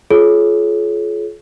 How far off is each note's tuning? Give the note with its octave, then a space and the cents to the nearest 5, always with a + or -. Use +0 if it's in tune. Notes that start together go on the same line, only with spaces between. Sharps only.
F4 +0 G#4 +40 C#5 +0